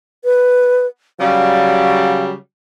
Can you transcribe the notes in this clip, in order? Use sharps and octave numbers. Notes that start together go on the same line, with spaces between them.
B4
C#3 F#3 G3 F5